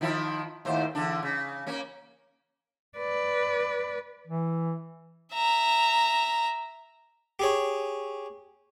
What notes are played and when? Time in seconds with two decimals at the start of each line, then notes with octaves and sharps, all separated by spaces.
0.01 D#3 F3 E4
0.65 D#2 A2 C5
0.95 E2 D3 D4
1.23 C#3
1.67 A#3 C#4
2.98 B4 D5
4.27 E3
5.34 E5 A#5
7.39 G4 G#4 C#5